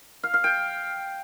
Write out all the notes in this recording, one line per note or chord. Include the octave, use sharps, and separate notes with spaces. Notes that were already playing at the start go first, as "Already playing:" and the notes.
F5
F5
G5